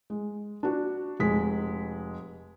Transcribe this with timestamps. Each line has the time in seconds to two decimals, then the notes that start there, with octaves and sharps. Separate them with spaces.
0.10 G#3
0.63 D4 F#4
1.20 F1 G#3 B6